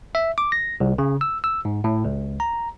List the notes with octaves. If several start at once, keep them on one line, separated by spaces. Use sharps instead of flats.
E5
D6
A#6
C2
C#3
E6
E6
G#2
A2
C#2
A#5